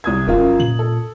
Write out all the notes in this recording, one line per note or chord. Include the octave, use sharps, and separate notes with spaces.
C2 D#6 G#6
D1 F#2 F4 A#4
A#2 F#7
A4